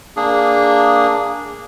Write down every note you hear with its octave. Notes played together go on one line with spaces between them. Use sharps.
A#3 D4 G#4